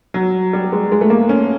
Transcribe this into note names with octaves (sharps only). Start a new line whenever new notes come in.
F#3
G3
G#3
G#3
A3
A#3
C#4